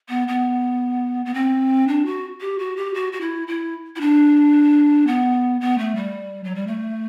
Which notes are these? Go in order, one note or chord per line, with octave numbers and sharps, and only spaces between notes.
B3
B3
B3
C4
D4
F#4
G4
F#4
G4
F#4
F#4
E4
E4
E4
D4
B3
B3
A3
G3
F#3
G3
A3